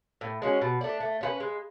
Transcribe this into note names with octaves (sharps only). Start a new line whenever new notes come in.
A2
G#3 C#4 F#4
B2
A3 D4
A3
C#4 F4 B4
G#3